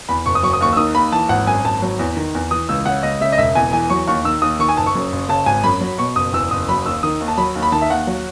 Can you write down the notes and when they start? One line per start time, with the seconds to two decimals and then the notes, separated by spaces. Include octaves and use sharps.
0.09 E2 B5
0.26 F#1 C#6
0.35 D#6
0.43 F#3 C#6
0.53 D#6
0.61 D#2 C#6
0.73 E6
0.77 D#3 D#6
0.95 D#2 B5
1.12 E3 A5
1.29 G#1 F#5
1.47 F#2 G#5
1.65 G#1 A5
1.82 F#3
1.99 E2
2.17 D#3
2.35 E2
2.51 E3 D#6
2.69 C#2 E6
2.86 C#3 F#5
3.03 C#2 D#5
3.21 C#3 E5
3.32 D#5
3.38 E1 E5
3.55 E2 G#5
3.73 E3 G#5
3.90 F#3 C#6
4.07 D#2 C#6
4.25 D#3 E6
4.42 D#2 D#6
4.59 D#3 C#6
4.69 G#5
4.77 F#1 A5
4.86 C#6
4.95 F#2
5.12 F#1
5.29 C#3 A5
5.46 G#1 G#5
5.64 F#2 B5
5.81 F#3
5.98 B2 C#6
6.16 F#1 D#6
6.33 E2 E6
6.51 F#1 D#6
6.69 F#3 B5
6.85 D#2 E6
7.03 D#3 D#6
7.21 D#2
7.28 A5
7.38 F#3 B5
7.55 D#2
7.62 B5
7.72 D#3 A5
7.82 E5
7.90 D#2 F#5
8.07 F#3